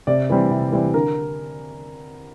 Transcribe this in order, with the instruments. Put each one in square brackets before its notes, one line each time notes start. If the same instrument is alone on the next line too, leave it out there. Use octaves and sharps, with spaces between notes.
[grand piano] C3 D5
E3 G3 C4
C3
E3 G3 C4
D3 A#4